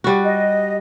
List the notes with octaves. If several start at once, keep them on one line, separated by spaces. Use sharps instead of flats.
G3 F#4
D#5